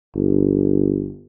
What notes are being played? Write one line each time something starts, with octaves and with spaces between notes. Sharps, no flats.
G1